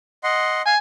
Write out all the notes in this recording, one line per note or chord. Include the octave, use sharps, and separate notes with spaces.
D#5 F#5 C6
F5 G#5